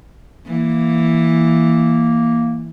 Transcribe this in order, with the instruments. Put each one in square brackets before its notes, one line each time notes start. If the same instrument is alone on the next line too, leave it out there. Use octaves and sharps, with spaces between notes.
[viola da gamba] E3 [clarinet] A#3